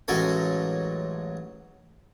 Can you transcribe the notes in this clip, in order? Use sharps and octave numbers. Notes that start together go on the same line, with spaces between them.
A1 F#3 G#3 A4 A#4 G#5